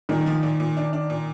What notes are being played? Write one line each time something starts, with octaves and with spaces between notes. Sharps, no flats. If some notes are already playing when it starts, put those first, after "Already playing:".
A#2 D#3 D#4
F3
A#2
A#2
D4
D4
A#2